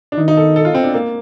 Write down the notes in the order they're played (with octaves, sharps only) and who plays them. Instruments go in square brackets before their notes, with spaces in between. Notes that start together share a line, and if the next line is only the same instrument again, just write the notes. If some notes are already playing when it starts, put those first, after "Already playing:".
[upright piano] D4
[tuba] D#3 [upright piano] D#4
[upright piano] D#4
A4
A4
F4
C4
D4
A#3